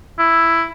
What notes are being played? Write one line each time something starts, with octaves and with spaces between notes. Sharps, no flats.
E4